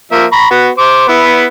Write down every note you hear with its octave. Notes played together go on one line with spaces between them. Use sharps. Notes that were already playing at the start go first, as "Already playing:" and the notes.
F3 A#3 E5
A#5 B5 C#6
B3 F#4
C5 D6
B3 E4